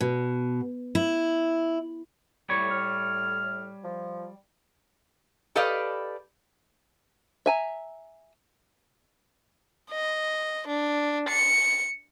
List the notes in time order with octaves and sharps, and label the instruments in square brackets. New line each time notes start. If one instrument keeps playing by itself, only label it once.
[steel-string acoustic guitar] B2
E4
[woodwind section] A2 [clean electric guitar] G3 C#5
[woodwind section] A2 F6
F3
[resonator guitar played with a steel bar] G4 A4 B4 D5 D#5 F5
[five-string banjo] E5 G#5 A#5
[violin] D#5
D4
C#7